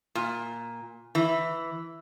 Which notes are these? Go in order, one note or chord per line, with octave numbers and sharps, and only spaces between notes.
A#2
E3